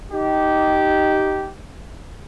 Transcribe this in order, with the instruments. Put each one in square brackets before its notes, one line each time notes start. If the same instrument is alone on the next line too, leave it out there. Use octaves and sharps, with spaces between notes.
[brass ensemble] D#4 G4